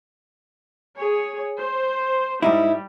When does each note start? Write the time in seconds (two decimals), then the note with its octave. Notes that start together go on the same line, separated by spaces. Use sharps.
0.97 G#4 C#5
1.59 C5
2.42 G#2 G3 D#4 E4